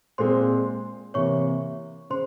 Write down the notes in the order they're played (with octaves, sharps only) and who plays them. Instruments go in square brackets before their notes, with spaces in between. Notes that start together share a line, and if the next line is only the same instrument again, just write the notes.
[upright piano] A#2 G#3 C4 [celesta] C5 C6
[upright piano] C3 E3 A#3 [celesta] C#5 C#6
[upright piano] C#3 [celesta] C5 C6